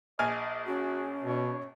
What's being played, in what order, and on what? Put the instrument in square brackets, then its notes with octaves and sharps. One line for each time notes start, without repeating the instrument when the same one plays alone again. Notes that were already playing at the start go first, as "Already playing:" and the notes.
[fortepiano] A#1 G#5 F6 [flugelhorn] D#5
[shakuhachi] C#4 [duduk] F#4 [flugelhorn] G#4
[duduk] B2 [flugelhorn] C#5